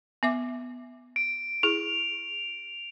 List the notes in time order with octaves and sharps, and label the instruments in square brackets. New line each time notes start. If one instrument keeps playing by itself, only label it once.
[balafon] B3 E5 D6
[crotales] D7
[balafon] E4 G#4 [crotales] F7